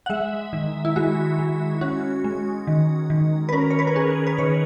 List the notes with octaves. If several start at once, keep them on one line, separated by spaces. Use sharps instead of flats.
F#5
G#3 E5
D#3
E4
G#3 F#4
G#3
C#4 F#4
G#3
D#3
D#3
B4
C#4 A#4
C#5
B4
A#4
C#4 G#4
B4
D#3 C#5